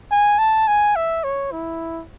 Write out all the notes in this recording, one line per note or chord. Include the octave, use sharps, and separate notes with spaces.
G#5
A5
G#5
E5
C#5
E4